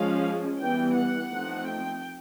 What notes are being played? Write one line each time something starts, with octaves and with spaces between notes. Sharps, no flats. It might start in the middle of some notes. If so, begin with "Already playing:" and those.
Already playing: F3 G#3 C#4 F5
E3 G3 B3 G5
F#5
F3 A3 C4 D#4
G5